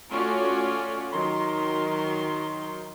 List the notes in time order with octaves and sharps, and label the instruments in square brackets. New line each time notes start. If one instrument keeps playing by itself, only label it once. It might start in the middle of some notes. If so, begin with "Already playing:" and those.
[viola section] A3 C#4 F4 F#4 C#5 D5
D#3 F#3 C6